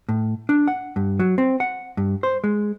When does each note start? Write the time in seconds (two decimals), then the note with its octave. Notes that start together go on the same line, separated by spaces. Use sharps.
0.09 A2
0.49 D4
0.68 F#5
0.96 G2
1.19 F#3
1.38 C4
1.60 F#5
1.97 G2
2.23 C5
2.44 G#3